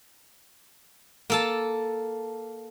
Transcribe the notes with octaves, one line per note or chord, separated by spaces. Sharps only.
A#3 A4 A5